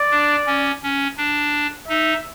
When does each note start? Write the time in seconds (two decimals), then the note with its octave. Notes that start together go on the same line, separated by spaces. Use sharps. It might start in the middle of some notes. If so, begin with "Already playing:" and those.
Already playing: D5
0.11 D4
0.47 C#4
0.83 C#4
1.18 D4
1.88 D#4 E5